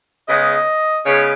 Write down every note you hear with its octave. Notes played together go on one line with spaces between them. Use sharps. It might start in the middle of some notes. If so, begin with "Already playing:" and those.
C#3 G#3 B3 D#5
C#3 G#3 B3 C#5